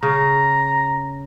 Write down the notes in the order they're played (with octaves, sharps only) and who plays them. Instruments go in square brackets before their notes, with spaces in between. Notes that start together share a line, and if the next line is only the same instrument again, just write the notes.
[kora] C#3 [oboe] A#5